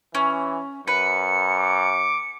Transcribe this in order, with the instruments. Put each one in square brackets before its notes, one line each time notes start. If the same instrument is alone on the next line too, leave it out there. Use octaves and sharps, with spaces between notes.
[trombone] E3 [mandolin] C#4
[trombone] F#2 [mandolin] B4 [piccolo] C#7
[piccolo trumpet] D6